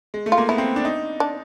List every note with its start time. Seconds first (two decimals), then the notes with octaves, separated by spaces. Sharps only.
0.14 G#3
0.26 A3
0.32 F4
0.38 A#3
0.49 B3 E4
0.58 C4
0.76 D4
0.85 D#4
1.20 D4